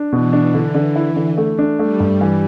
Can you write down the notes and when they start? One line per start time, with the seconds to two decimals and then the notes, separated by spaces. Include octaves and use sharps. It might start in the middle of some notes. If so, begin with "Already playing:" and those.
Already playing: D4
0.12 B2 E3
0.33 D4
0.54 D3
0.74 D3
0.96 E4
1.16 D3
1.37 A3
1.59 D4
1.79 G3 A3
2.00 G2
2.21 E3